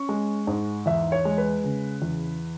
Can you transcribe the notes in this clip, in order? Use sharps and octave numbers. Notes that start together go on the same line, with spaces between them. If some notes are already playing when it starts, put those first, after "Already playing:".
Already playing: C#4 C#6
G#3
G#2
E2 E5
C#5
G#3
B4
C#3
E2